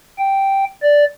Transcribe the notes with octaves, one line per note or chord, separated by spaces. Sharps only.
G5
D5